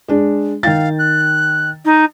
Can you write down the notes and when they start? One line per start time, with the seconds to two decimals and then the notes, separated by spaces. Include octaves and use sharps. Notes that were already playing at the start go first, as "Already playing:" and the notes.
0.08 G#3 D4
0.63 D#3 F5 G5 A6
0.99 F#6
1.85 D#4